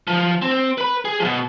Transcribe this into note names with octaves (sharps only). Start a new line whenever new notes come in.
F3
C4
B4 B5
G#4
B2 F3